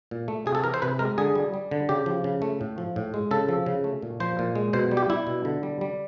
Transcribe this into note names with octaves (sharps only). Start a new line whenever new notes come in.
A#2
A3
C3 G#4
A4
E3 A#4
C5
C3 B4
G#3 A#4
D3 G#4
G3
G3
D3
C#3 G4
F3
C#3
A3
A2
F3
A2
G#3
C#3 A4
F3
C#3
A3
A#2
F3 C5
A#2
G#3
B2 C5
G3
G4
G3 E4
B2
D3
G3
G3